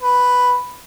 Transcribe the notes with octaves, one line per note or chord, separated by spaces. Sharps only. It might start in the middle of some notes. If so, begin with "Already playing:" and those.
B4